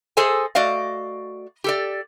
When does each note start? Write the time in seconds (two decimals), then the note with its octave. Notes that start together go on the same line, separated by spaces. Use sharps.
0.17 G#4 A4 C5 D#5 G#5
0.55 A3 F#4 D5 D#5 F5
1.64 G4 A4 D5